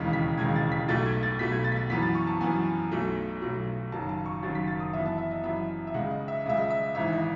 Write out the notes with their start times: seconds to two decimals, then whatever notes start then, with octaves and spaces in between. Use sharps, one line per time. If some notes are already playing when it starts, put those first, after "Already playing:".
Already playing: E1 D#2 C#3 E3 G#3 B6
0.13 B6
0.38 E1 D#2 C#3 E3 G#3 G#6
0.56 A6
0.72 B6
0.89 B1 B2 A3 A6
1.06 G#6
1.23 A6
1.39 B1 B2 A3 B6
1.52 G#6
1.64 A6
1.72 B6
1.77 A6
1.90 F#2 E3 B3 B6
2.02 A6
2.15 C#6
2.27 A5
2.41 F#2 E3 B3 G#5
2.91 B1 B2 F#3 A3
3.42 B1 B2 F#3 A3
3.92 F#1 F#2 D#3 F#3 A5
4.09 A5
4.26 C#6
4.43 F#1 F#2 D#3 F#3 A6
4.55 B6
4.67 A6
4.80 D#6
4.93 F#2 E3 B3 E5
5.06 A5
5.18 E5
5.31 D#5
5.43 F#2 E3 B3 E5
5.87 E5
5.94 C#2 C#3 G#3 F#5
6.11 D#5
6.28 E5
6.45 C#2 C#3 G#3 E5
6.57 D#5
6.70 E5
6.95 G#1 G#2 E3 E5
7.12 D#5